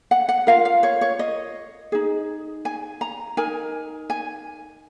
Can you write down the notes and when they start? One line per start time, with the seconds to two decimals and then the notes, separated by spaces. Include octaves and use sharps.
0.11 F#5
0.29 F#5
0.47 F4 A#4 F5
0.65 F5
0.83 C#5
1.01 C#5
1.19 D#5
1.92 D#4 G#4
2.65 G#5
3.01 A#5
3.37 D#4 A#4 G#5
4.10 G#5